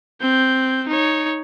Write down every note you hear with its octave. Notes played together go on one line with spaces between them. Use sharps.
C4 G6
D#4 C#5